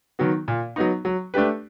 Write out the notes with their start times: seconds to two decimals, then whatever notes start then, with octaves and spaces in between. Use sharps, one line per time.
0.19 D#3 F#3 B3
0.48 A#2
0.76 F#3 B3 D#4
1.05 F#3
1.34 A3 D4 G4 B4